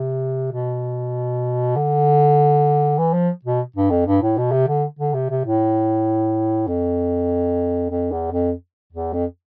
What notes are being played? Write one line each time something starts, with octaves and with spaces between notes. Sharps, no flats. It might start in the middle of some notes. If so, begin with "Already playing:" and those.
Already playing: C3
B2
D3
E3
F3
B2
G2
F2
G2
A2
B2
C3
D3
D3
C3
C3
A2
F2
F2
E2
F2
E2
F2